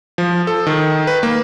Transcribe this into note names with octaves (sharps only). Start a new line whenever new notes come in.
F3
A4
D#3
B4
A#3